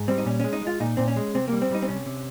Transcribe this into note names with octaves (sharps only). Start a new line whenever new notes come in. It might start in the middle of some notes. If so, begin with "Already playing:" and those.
Already playing: G#2
G3 C4
D#4
A#2 C#4
G#3 C#4
D#4
G#3
F4
A#2 D#4
A#2 C4
C#4
G#3
C3 C4
G3 A#3
C4
G3 D#4
C4
C3 C#4
C3